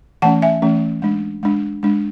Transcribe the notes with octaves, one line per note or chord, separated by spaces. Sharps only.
E3 A3 C#4 F#5 A5
E5 G#5
E3 A3 C#4
G#3 D4
G#3 D4
G#3 D4